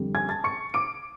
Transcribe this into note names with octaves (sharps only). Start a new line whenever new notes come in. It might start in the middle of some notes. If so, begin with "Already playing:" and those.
Already playing: F2 D3 G3
G#5 G#6
A5 A6
C#6 C#7
D6 D7